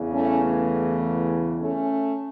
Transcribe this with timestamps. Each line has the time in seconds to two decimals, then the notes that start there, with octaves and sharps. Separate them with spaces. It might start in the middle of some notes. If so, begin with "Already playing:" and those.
Already playing: E2 C#3 E3
0.13 A3 C#4
0.42 A3
1.61 A3 C#4